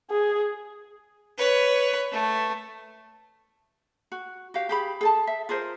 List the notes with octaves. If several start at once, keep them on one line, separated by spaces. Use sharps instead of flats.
G#4
B4 C#5
A3
F#4
F#4 G4 F5
G4 G#4 B5
G#4 A4 A5
E5
F4 G#4 A#4 C5